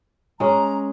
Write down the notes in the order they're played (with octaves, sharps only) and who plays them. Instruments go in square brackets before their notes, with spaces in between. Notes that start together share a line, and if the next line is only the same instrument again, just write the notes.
[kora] G#3 C#4 [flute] A#5